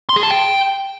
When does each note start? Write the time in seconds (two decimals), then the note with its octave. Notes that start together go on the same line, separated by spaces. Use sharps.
0.09 C6
0.16 G#4
0.23 A5
0.30 G5